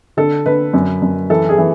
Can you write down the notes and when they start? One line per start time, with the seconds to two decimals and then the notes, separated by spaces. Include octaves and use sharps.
0.17 D3 A4
0.46 D3 B4
0.74 F#2
1.02 F#2
1.30 E3 A4
1.49 G#4
1.58 E3